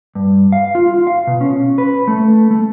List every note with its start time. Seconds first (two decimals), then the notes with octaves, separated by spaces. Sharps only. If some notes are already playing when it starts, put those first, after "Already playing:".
0.15 G2
0.52 F5
0.75 F4
0.94 F4
1.07 F5
1.27 B2
1.41 C#4
1.78 B4
2.08 A3
2.51 A3